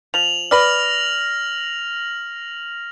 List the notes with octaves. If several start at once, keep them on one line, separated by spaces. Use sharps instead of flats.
F3 F7 F#7
B4 D5 F6 A#6 F#7